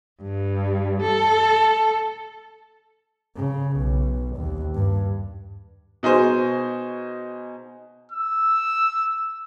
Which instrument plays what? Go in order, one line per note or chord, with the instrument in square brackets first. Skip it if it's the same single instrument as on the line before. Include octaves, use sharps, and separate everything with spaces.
[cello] G2
A4
[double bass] C#3
B1
D#2
G2
[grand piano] B2 D#4 G#4 C5
[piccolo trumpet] E6